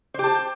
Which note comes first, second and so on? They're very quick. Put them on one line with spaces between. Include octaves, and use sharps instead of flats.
C5 G4 A5